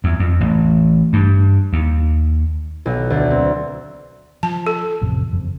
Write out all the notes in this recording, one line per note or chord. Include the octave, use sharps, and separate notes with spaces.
E2
F2
A1
G2
D#2
B1
D2
C4
F3 A5
A4
A1 F2 C3
F#1 F2